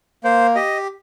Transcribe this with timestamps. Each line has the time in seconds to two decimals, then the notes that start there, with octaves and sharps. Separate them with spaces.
0.24 A#3 C5
0.55 G4 D#5